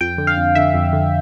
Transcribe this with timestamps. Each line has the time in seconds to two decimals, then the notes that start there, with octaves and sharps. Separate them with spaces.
0.01 F2 G5
0.18 D3
0.27 F5
0.37 F2
0.55 D3 E5
0.74 F2
0.93 D3